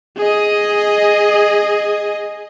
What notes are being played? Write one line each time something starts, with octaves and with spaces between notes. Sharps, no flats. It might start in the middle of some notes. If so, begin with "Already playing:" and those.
G#4 D#5